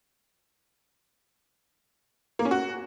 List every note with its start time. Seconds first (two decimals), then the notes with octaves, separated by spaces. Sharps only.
2.39 A#3
2.45 C#4
2.51 F#4